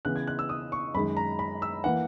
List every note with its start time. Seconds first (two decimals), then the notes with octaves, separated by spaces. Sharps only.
0.05 C#3 E3 B3 F#6
0.16 G#6
0.27 F#6
0.39 E6
0.49 D#6
0.72 C#6
0.94 F#2 D#3 G#3 B5
1.17 A#5
1.39 B5
1.62 E6
1.84 E3 A#3 F#5